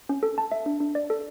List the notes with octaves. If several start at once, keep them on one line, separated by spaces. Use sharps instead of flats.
C#4
A4
A5
E5
D4
D4
D5
A4